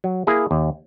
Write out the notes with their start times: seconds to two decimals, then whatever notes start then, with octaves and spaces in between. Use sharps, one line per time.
0.04 F#3
0.27 A#3 E4 G#4
0.51 D#2